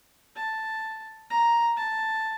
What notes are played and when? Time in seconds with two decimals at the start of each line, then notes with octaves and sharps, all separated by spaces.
0.36 A5
1.30 A#5
1.77 A5